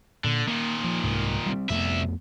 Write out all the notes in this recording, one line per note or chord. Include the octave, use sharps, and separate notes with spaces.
A#2 D3
A#2 D#3 A#3
F3
C2 G#2
G3 G#3 C4
C2 F2 A3 B3 E5